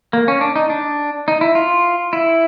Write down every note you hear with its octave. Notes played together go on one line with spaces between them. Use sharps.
A#3
C#4
D4
D#4
D4
D#4
E4
F4
E4